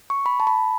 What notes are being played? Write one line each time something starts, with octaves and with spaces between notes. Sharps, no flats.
C#6
B5
A5
B5